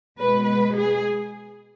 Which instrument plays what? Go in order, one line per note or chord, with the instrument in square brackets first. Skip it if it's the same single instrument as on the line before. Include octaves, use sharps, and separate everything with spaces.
[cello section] B2 G#3 B3 B4
B4
G#4